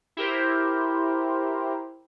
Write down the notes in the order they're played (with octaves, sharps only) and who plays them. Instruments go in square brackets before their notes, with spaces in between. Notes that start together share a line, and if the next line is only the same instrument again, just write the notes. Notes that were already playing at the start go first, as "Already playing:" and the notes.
[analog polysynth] E4 G4 A#4 C5